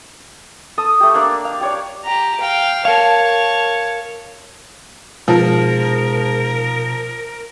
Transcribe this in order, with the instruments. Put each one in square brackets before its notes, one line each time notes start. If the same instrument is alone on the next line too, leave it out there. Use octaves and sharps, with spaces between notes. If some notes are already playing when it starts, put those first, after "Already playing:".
[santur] A4 D#6
A3 G4
A#3 D4 D5
F5
G4 C#5 D5
[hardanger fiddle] G4 A#5
F5 G5
[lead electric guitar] A#4 F5 [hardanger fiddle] C#5 A5
[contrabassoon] G#2 [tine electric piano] B2 [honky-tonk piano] F3 [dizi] A#4